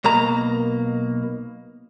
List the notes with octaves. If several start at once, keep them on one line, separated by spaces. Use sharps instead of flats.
B1 B2 A#3 A#5